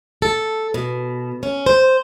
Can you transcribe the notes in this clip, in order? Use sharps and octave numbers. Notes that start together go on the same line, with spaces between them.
A4
B2
C#4
C5